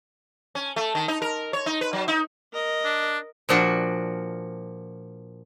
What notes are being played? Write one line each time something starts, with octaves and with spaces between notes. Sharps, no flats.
C#4
A3
D#3
D#4
A#4
C#5
D#4
B4
F#3
D#4
A#4 D#5
D4
A#2 F3 D4 F#4